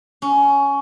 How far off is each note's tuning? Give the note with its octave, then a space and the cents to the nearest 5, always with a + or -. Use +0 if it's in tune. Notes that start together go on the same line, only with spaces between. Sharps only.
C#4 +15